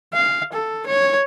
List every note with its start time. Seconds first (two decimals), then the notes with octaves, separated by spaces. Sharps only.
0.14 F5
0.53 A4
0.87 C#5